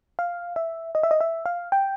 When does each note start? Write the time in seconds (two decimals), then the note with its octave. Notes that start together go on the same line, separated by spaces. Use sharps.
0.19 F5
0.56 E5
0.95 D#5
1.03 E5
1.11 D#5
1.21 E5
1.46 F5
1.72 G5